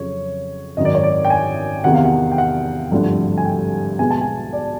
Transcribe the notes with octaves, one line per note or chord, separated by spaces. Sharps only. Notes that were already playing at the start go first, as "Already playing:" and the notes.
Already playing: F2 C#3 F#3 C#5
G#1 F#2 D#3 D#5
D5
C#5
D5
G5
G#5
E2 C3 D#3 F#5
F5
F#5
G5
F#5
G#1 G2 D3 F3 A3
G#5
G5
B1 B2 G#3 B3 G#5
A5
G#5
D5